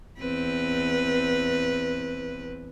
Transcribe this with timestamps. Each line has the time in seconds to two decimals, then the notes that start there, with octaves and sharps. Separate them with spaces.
0.18 E2 C4 B4